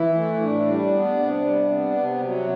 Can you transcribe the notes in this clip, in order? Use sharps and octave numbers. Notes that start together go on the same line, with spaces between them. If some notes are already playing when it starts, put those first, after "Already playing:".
Already playing: E3 E4
A3
A2 D4
G3
B3
C3
G3
B3
C3
F#3